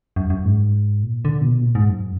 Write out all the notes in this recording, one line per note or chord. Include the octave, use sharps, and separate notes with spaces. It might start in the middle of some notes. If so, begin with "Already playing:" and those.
F#2
F#2
G#2
A#2
D3
A#2
B2
A#2
G#2
F#2